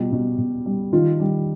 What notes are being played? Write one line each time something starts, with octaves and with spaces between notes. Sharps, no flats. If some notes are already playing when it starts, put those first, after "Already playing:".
Already playing: B2 G3 F4
B2
B2
G3
D#3 F4
G3